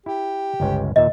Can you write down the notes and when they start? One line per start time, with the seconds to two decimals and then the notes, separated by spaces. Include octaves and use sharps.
0.06 E4 G4
0.60 G1 C#2 C#4
0.96 D#2 A#2 D#5 E5